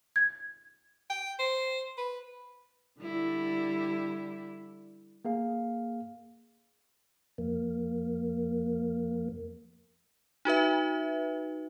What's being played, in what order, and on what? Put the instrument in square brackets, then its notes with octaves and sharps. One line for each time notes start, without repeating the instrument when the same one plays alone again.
[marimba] G#6
[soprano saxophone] G5
C5
B4
[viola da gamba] D3 G3 E4
[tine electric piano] A#3 G#4 F5
[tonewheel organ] F2 A#3
[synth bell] D#4 F#4 B4 E5